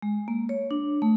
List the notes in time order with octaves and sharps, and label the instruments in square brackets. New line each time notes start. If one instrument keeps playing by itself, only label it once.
[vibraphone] G#3
A#3
C#5
D4
A3